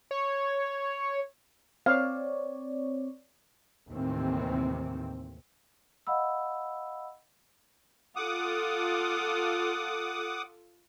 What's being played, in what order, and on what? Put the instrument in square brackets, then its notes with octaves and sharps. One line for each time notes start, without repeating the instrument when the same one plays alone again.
[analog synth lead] C#5
[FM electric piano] C4 C#5 D5 [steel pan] F5
[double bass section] D#2 A2 C3 D#3 E3 C4
[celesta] D#5 F5 F#5 B5 E6
[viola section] F4 A4 [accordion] F#5 D6 D#6